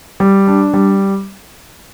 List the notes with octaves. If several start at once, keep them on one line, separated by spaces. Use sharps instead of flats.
G3
D4
G3